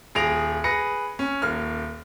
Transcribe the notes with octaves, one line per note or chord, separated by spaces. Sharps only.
D#1 G#4 A#6 D7 F7
G#4 B4 A#6 C#7
C#4
D#1 A#3 F6